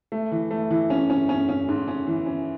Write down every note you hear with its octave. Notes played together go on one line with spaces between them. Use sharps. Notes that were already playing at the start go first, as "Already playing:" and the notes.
A3
E3
A3
E3
C#4
C#4
C#4
C#4
G#2
C#4
E3
C#4